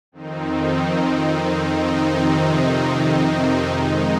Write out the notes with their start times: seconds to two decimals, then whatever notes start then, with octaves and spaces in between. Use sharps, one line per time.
0.12 F2 D#3 C4 D#4
1.91 F2 C3 D#3 C4 D#4
3.69 F2 D#3 G#3 D#4